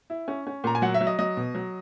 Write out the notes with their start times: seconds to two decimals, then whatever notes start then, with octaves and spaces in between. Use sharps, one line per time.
0.10 E4
0.28 C#4
0.47 C#4
0.64 A#2 A#5
0.75 G#5
0.82 F#3 F#5
0.94 E5
1.01 F#3
1.07 D#5
1.19 F#3 D#5
1.37 B2
1.55 F#3